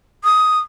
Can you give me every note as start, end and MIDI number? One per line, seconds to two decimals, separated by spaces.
0.24 0.58 87